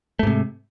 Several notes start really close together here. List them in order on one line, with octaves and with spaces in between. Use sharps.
A3 G#2 C3